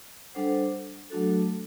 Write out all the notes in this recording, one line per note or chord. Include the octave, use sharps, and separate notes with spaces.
G3 D4 A4 C5 F#5
F#3 A3 D4 F#4 A4